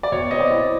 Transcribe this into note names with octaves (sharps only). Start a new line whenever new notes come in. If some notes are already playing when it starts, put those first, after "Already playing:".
D5
B2 C#5
C4 D#5
D5
E4